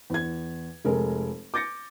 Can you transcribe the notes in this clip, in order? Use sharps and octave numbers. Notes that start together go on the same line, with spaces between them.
E2 G#6
F1 G#3 A4 A#4
D6 G6 A6 A#6 C#7